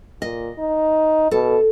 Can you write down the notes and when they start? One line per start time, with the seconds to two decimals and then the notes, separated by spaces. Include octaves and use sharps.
0.22 A#2 D#5
0.59 D#4
1.31 B2 A4